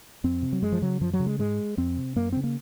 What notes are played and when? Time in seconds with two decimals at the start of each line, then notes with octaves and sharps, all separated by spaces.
0.24 F2 C4
0.42 C3
0.52 F#3
0.62 F#2 G#3
0.72 F3
0.82 C#3 F#3
1.01 F#2 F3
1.13 F#3
1.20 C#3
1.26 G#3
1.39 G#2 G#3
1.77 F2 C4
1.97 C3
2.16 F#2 A#3
2.32 C#3 C4
2.44 A#3